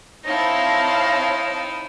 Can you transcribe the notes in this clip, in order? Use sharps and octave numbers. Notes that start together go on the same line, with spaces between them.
C4 D#4 E4 C#5 F5 A5 A#6